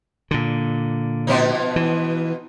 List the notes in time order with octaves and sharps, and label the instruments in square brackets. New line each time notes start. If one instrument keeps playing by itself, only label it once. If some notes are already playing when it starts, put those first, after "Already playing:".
[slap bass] A#2 D3
[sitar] B2 F3 D#4
[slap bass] E3